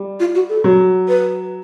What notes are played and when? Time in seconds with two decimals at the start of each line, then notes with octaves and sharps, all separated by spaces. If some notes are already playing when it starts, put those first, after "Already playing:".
Already playing: G3
0.20 F4
0.35 F#4
0.49 A4
0.64 F#3
1.08 B4